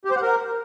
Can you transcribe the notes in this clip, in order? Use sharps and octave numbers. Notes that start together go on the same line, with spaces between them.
G4
C5
F#5
A#4